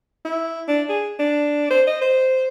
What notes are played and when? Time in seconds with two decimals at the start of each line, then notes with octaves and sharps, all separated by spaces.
0.25 E4
0.68 D4
0.89 G#4
1.19 D4
1.71 C5
1.87 D#5
2.01 C5